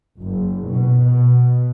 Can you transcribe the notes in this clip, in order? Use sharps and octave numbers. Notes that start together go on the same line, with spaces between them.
F#1
B2
B2